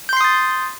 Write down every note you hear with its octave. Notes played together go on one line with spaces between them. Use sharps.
C6 D#6 G6 A6 C7